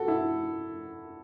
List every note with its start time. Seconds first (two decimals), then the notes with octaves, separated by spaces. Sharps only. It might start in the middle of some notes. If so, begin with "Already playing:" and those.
Already playing: F#4 A4
0.08 E4